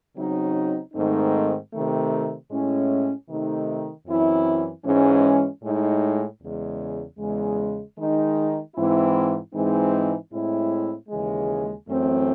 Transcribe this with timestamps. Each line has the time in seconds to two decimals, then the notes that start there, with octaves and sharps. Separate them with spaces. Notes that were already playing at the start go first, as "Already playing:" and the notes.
0.15 C#3 F#3 C4 D#4
0.93 G#2 D#3 A3 C4 D#4
1.72 C3 D#3 A3
2.50 A2 G#3 C#4 E4
3.28 C3 D#3 A3 D#4
4.07 F#2 E3 C4 E4
4.85 G#2 E3 G#3 C#4
5.63 A2 G#3 D#4
6.41 E2 C#3 G#3
7.18 E2 C#3 G#3
7.97 D#3 G#3 D#4
8.75 G#2 E3 C4 E4
9.54 G#2 E3 G#3 C4 D#4
10.31 A2 G#3 C4 E4
11.09 D#2 C#3 E3 G#3
11.87 F#2 E3 A3 C4